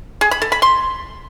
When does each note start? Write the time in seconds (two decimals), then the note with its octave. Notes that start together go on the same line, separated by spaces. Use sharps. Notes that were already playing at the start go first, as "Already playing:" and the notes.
0.21 G#4
0.31 B5
0.42 A4
0.52 B5
0.62 C6